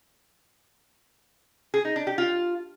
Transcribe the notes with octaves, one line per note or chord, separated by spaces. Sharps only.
G#4
D#4
D4
G4
F4